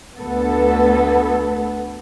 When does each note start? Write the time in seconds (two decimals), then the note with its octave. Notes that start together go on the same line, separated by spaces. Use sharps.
0.19 D2 B3 A4